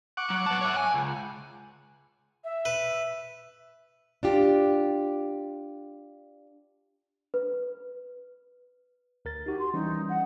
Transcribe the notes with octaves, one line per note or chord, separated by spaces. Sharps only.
F#5 C#6 D6
F#3
B3 A5
C#5 E5
G#5
C#2
E5
B4
D4 F4 G4
B4
D2 A#4 A6
D#4 F#4 G4
C6
E3 G3 C#4 D#4
F#5